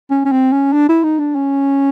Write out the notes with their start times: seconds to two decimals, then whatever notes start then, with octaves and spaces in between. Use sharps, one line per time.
0.11 C#4
0.25 C#4
0.32 C4
0.53 C#4
0.73 D4
0.89 E4
1.03 D#4
1.19 D4
1.36 C#4